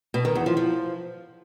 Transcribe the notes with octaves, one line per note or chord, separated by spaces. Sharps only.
B2
D#3
E2
F3
F3